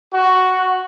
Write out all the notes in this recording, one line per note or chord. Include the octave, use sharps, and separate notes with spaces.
F#4